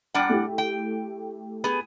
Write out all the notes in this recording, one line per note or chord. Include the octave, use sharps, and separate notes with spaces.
G3 D4 F#5 G5 A#5
A3 E4 G4
G5
B3 G#4